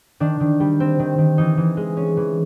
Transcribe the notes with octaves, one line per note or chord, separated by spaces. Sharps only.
D#3 D4
D#3
G3
C4
D#3
D#3
E3 D#4
E3
G#3
C#4
E3